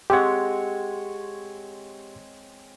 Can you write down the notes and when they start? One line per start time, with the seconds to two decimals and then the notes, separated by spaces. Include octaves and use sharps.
0.10 G#3 C4 G4 C#5 F#5